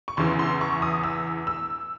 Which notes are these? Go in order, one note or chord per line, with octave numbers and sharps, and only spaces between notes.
C#6
E2 C#3 E3 C6
C6
C#6
D#6
E6
E6